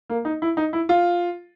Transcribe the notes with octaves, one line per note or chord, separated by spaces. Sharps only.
A#3
D#4
E4
D#4
E4
F4